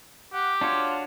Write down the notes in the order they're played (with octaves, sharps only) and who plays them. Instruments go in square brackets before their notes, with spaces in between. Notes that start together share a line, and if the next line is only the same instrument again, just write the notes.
[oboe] G4 [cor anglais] F#5
[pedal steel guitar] D4 F#4 C#5 [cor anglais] F4